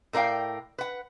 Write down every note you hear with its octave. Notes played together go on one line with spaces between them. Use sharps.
A2 A#4 D5 F5 G5
B4 F#5